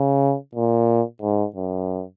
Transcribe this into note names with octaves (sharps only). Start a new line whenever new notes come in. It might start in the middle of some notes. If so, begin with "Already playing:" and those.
Already playing: C#3
A#2
G#2
F#2